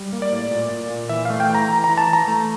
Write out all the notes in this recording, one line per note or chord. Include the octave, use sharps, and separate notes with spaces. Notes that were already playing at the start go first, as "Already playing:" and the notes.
Already playing: G3
A#3
D5
A2
A#2
A#2
A#2
E3 E5
A3 F5
G5
E3
A#5
E3 A#5
E3 A#5
A5
E3
A#5
A3